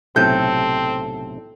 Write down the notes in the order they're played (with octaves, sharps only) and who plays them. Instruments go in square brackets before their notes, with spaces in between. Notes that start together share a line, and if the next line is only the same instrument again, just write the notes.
[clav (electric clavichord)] B1 A2 C3 [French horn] C4 [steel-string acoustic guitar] A4 [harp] G6